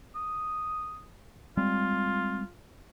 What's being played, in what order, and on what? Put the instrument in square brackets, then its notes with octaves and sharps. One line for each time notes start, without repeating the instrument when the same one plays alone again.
[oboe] D#6
[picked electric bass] G3 G#3 C4 [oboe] F4